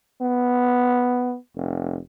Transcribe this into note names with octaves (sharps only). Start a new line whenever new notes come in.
B3
F1